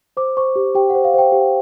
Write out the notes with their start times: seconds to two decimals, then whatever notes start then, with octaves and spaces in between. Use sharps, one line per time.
0.17 C5 D6
0.37 C5 C#6
0.56 G4
0.75 G4 G5
0.90 C5 F#5
1.04 F5
1.14 C5 G5
1.32 G4